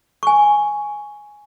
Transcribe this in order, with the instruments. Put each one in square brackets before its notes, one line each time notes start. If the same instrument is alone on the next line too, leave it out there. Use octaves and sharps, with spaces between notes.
[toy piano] G#5 C#6